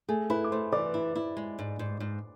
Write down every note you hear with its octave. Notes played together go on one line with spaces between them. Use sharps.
A3 G#4 G#5
E4 B4 B5
D6
A3 C5 C6
E3 D5 D6
E4
E4
G#3
G#2
G#2
G#2